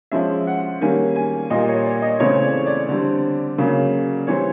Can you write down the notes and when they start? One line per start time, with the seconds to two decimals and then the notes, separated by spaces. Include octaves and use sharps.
0.12 F3 G#3 C#4 E5
0.47 F#5
0.81 D#3 G3 A#3 C#4 G#5
1.16 G#5
1.50 A#2 G3 A#3 D#5
1.68 C#5
1.85 D5
2.02 D#5
2.20 C#3 E3 A3 C4 C#5
2.43 D5
2.66 D5
2.89 D3 G3 C4
3.58 C#3 F#3 A#3 C#4
4.27 E3 G3 C4 C#5